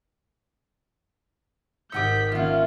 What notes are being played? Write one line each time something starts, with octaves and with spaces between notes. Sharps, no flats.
G#1 G4 D#5 F#5 E6 G6 B6 C#7
D#3 A#3 C#4 E4 F4 F#5